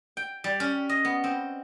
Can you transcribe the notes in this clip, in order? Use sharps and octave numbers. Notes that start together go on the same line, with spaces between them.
G5
G3
C#4
D#5
B3
C4